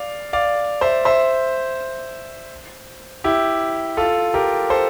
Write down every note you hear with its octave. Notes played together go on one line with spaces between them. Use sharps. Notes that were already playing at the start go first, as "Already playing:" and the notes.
Already playing: D5 F5
D5 F5
C5 E5
C5 E5
E4 G4
F4 A4
G4 A#4
A4 C5